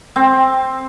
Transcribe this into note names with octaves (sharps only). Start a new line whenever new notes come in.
C4